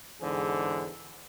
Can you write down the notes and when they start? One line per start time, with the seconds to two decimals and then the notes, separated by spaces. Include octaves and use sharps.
0.21 E2 G#2 D3 E3 G#4 C5